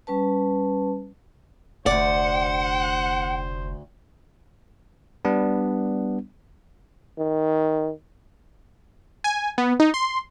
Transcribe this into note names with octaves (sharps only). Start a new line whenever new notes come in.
G3 C#4 B4 A5
F1 D2 C5 D5 F#5
G3 B3 D4
D#3
G#5
B3
D#4
C6